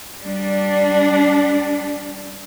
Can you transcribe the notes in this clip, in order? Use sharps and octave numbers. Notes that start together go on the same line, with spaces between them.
G3 D4